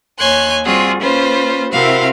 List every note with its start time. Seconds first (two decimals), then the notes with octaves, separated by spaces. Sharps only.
0.18 D#2 C#5 G#5 C6 F#6
0.64 G3 C4 F4 F#4 G#4
1.01 A#3 C#4 F4 B4 C5
1.72 C3 C4 E4 F#4 A#4 F5